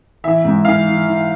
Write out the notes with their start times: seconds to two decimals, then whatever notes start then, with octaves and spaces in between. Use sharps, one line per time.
0.24 E3 E5
0.44 G#2
0.64 E3 F5
0.85 E3
1.05 E3